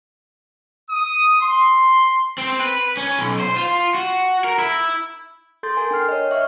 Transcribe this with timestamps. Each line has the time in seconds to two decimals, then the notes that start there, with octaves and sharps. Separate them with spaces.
0.90 D#6
1.41 C6
2.38 C4
2.61 B4
2.97 C#4
3.19 B1
3.40 C5
3.57 F4
3.94 F#4
4.44 A#4
4.59 E4
5.63 A4 C6 G6 A6
5.77 A#4 G#5
5.91 D4 G5 F6 C7
6.09 C#5 D#5
6.30 D5 E5 C#6 F6